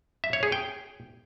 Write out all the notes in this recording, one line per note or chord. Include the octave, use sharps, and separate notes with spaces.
E5
C#5
G#4
G5